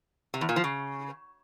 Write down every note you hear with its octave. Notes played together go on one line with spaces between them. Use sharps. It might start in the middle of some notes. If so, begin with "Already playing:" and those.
C3
E2
A#2
F3
C#3